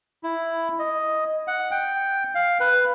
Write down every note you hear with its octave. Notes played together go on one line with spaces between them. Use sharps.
E4
D#5
F#5
G5
F5
B4